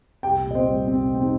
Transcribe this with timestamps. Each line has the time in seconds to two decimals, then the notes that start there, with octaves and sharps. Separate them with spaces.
0.23 C2 G4 G5
0.45 A#2
0.51 D#5
0.55 C4 C5
0.67 G3
0.87 C2 C4
1.09 C2
1.15 C4
1.20 D#4